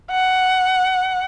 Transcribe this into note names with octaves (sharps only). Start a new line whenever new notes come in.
F#5